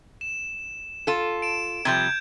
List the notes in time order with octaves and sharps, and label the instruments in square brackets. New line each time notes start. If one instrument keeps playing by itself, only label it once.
[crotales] E7
[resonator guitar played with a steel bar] F4 A4
[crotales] D7 E7
[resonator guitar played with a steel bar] C3 F3 G3 [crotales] G6 G#6